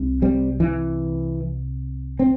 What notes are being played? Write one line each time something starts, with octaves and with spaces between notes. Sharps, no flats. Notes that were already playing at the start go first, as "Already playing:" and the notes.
Already playing: C2 C3
G3 C4
E3
C4